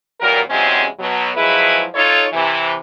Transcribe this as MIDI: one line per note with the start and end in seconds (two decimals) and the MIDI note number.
0.20 0.40 46
0.20 0.40 52
0.20 0.40 54
0.20 0.40 55
0.20 0.40 70
0.50 0.85 40
0.50 0.85 48
0.50 0.85 54
0.50 0.85 56
0.50 0.85 60
0.50 0.85 61
0.99 1.30 47
0.99 1.30 54
1.36 1.85 53
1.36 1.85 54
1.36 1.85 56
1.36 1.85 64
1.36 1.85 68
1.36 1.85 71
1.95 2.25 63
1.95 2.25 65
1.95 2.25 69
1.95 2.25 73
2.33 2.77 48
2.33 2.77 52